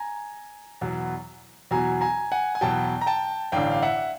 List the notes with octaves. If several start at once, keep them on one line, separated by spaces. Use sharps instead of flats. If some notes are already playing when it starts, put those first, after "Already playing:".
Already playing: G#5 A#5
E2 B2 F#3
E2 B2 F#3 G#5 A#5
G#5 A#5
F#5 G#5
G#5
E2 B2 F#3 G5 A5
A#5
G5 A5
A1 G2 D3 F5 G5
F5
E5 F#5